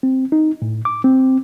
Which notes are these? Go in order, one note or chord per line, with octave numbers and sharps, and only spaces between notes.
C4
D#4
A2
D6
C4